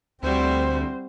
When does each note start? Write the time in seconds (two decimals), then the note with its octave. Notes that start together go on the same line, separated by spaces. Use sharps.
0.23 D2 G3 C4 E4 F#4 C5